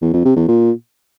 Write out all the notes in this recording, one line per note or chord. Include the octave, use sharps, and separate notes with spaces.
E2
F2
C3
E2
A#2